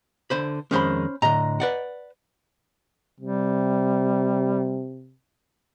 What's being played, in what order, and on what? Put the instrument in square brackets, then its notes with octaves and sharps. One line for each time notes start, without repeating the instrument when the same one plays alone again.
[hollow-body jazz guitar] D3 C5 B5
[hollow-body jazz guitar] F2 D#3 G#3 [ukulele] C#4 C5 B5
[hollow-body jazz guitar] A2 D3 [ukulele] D#5 A#5
[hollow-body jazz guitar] B4 D5 F#5
[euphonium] C3 [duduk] G3